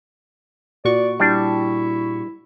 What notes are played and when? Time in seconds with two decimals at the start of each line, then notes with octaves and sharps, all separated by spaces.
0.85 A#2 F#4 D5 C#6
1.20 G3 D4 E4